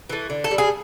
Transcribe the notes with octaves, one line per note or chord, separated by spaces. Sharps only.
E3 A3
D3
A4
G3
G#4